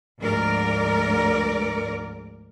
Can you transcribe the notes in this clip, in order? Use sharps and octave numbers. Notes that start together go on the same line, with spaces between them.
D2 G#2 F3 A#4 D5